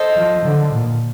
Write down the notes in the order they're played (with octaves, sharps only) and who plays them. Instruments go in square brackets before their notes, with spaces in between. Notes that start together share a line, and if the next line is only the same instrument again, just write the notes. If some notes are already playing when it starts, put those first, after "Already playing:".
Already playing: [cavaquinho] A4 C5 D#5
[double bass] F3
D3
A#2